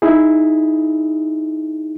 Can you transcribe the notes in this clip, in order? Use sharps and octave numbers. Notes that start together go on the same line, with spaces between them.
D#4 E4 G#4